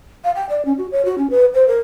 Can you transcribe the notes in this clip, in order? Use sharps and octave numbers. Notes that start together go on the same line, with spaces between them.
F5
G5
D5
C#4
F#4
C#5
F#4
C#4
B4
C5
A#4